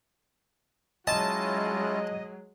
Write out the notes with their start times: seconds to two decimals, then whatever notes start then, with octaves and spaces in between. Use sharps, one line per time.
1.07 F#3 G#3 C#4 E4 F4 D#5 A5